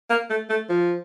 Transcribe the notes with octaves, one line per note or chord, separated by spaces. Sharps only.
A#3
A3
A3
F3